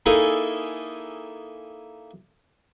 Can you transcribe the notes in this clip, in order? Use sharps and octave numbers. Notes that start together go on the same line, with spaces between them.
A#3 D#4 E4 G#4 A4